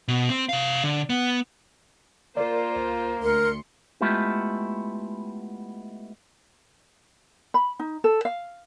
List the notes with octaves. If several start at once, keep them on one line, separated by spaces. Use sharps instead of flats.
B2
C4
C3 F5
D3
B3
A#3 F4 A#4 C5 D5
C#2
D2 A#4 C6 C#7
G#3 A3 B3 E4 F4 G4
B5
D#4
A4
F5